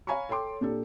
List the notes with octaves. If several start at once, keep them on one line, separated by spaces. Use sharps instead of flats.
C#5 F5 G#5 A#5 B5 C#6
A4 C#5 G5 C6 D6
A#2 D4 G4 A4